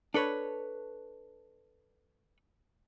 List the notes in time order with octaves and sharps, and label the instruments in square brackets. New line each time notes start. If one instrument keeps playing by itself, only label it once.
[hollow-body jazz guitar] D4 A4 B4 C#5